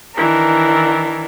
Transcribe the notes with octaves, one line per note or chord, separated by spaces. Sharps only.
D#3 E3 D4 A#4